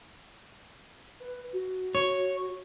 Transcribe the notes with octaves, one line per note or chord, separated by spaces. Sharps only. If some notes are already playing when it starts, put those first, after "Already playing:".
B4
F#4
C#5